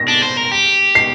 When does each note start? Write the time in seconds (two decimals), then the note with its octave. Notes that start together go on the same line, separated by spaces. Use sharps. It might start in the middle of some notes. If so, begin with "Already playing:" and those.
Already playing: A#6
0.08 D4
0.22 C5
0.37 A#4
0.51 G4
0.95 C7